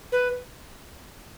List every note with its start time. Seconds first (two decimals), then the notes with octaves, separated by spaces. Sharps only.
0.12 B4